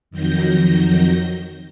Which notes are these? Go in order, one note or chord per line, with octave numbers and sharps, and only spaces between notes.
F2 D#3 F#3 G6 A#6